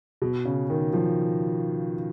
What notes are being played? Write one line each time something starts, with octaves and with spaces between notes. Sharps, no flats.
B2
C#3
D#3
F3